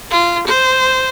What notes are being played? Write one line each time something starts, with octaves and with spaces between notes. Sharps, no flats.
F4
C5